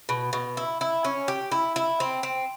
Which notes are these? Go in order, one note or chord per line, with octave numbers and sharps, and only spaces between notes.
B2
B2
E4
E4
C#4
G4
E4
E4
C4
C4